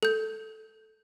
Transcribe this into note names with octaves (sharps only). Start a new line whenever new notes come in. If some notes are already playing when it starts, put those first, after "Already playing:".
A4 G6